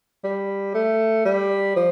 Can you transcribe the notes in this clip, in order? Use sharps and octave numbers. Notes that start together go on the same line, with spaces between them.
G3
A3
G3
F3